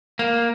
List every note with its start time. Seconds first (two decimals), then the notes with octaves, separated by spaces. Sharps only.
0.19 A#3